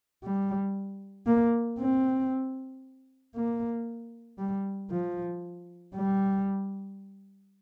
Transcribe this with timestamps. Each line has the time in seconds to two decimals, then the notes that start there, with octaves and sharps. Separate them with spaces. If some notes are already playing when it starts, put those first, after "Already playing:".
0.23 G3
1.26 A#3
1.79 C4
3.34 A#3
4.38 G3
4.90 F3
5.95 G3